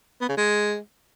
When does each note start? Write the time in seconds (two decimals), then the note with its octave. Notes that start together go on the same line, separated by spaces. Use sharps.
0.21 B3
0.29 C#3
0.37 G#3